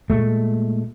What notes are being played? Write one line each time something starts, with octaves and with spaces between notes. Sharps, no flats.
A#2 G#3 A3